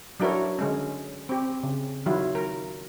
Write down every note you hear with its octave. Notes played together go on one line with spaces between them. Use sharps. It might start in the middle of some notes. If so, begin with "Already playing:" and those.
F#3 D4 E4 A#4 B4 C#5
D3 G#3 C#4
C4 G4
C#3
D#3 F#3 E4 F4
A#4